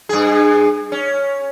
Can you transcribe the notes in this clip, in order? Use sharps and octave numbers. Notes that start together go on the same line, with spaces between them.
G2 G#4
C#4